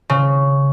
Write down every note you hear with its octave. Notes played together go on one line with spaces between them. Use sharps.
C#3